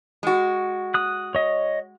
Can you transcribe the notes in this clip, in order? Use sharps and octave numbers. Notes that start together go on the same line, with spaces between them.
G#3 F#4
D#6 F#6
C#5 D#5